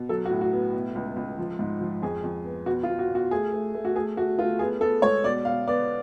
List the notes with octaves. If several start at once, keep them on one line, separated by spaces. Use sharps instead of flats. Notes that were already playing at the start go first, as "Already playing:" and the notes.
Already playing: B2
F#3 A4
F#4
A2
F#4
B3
B2
C#2
C#2
F3
G#2
F3
F2 G#4
F2
B3
B2 F#4
F4
B2
F#4
B2 F#4
A3 G#4
A3
A3
F#4
A3 G#4
A3 F#4
A3 F4
B3 G#4
B3 A4
G#3 C#5
B2 D5
B2 F5
B3 D5